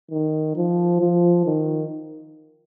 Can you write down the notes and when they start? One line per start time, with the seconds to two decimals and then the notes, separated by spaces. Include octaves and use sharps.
0.11 D#3
0.56 F3
1.00 F3
1.45 D#3